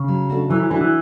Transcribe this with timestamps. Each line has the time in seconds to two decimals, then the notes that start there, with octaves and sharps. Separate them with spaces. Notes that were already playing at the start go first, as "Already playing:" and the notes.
Already playing: C#3
0.08 F#3
0.29 A3 D4 F#4
0.50 E3 F#3
0.60 E3
0.70 E3 A3 D4 F#4
0.81 E3